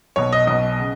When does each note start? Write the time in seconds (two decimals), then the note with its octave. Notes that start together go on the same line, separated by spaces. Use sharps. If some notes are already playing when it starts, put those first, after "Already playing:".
0.16 B1 B2 C#5
0.33 D#5
0.47 B1 B2 D#5
0.79 C#3